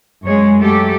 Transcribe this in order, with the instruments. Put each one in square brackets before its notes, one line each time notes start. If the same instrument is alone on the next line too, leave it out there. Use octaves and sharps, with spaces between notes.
[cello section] F#2 G#3 C#5
F#3 A3 G4 A4